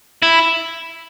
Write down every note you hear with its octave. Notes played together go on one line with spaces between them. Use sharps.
E4